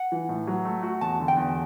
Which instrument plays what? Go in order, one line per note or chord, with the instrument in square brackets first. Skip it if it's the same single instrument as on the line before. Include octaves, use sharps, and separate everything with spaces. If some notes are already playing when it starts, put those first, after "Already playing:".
Already playing: [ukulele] F#5
[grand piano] E3
A2
F#3
A3
F#4
[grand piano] E2 [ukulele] A5
[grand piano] D3
[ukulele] G5
[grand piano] E2